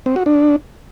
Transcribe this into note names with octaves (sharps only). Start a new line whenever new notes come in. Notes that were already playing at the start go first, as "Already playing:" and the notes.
C4
F#4
D4